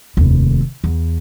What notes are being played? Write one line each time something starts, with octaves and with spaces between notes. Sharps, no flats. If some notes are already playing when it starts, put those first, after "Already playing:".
F1 D#2
E2